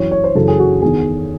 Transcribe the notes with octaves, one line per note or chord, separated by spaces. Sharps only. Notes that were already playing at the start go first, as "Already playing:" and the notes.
Already playing: F#2 E3 C#5
C#5
C5
F#2 C#3 E3 A4
G#4
F#4
E2 D#3 G#4